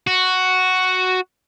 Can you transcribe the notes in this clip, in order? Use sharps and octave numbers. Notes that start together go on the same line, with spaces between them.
F#4